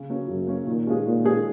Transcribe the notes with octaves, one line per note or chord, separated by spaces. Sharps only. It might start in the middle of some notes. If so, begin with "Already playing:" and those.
Already playing: C#3
F#3 A#3 C#4
F#2 C#3
F#3 A#3 C#4
A#2 D#3
G#3 C#4 F4 G#4
A#2 D#3
G#3 C#4 F4 G#4